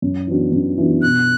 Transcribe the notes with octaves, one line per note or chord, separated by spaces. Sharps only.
F#2
E3 B3 D4 F#4
F#2
E3 B3 D4 F#4
B2 F#6